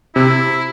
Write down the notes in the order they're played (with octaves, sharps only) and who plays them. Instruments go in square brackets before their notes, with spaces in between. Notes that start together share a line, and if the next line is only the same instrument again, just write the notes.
[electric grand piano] C3 [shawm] E4